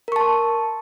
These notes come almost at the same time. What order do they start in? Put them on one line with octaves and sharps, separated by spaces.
A#4 C#6 A5 C6